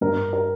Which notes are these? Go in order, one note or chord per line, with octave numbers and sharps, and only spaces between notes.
G2 A#4
A#4